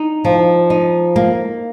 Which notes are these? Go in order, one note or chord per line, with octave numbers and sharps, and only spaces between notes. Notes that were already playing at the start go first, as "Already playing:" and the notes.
Already playing: D#4
F3
D#4
A#3